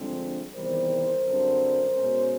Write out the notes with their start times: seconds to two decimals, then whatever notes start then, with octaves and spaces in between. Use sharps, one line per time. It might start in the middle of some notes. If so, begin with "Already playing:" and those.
Already playing: G2 D3 F3 G#3 C4
0.54 E2 C3 D#3 G3 A#4 C5
1.24 F#2 D3 G3 C4
1.95 B2 G#3 C#4